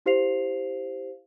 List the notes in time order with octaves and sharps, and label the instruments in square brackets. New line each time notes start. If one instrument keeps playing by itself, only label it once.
[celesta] E4 G4 C5 F5 C7 F7